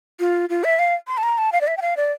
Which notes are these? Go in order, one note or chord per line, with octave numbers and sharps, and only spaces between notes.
F4
F4
E5
F5
C6
A5
A#5
A5
F5
D5
E5
G5
F5
D5